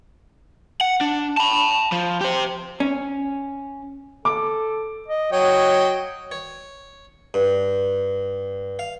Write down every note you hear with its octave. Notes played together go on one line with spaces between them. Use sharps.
F#5
D4
A5 B5
F3
G4 C5
C#4
A4 D6
D#5
F#3 C#5 D#5 G5
C#5
G2
F5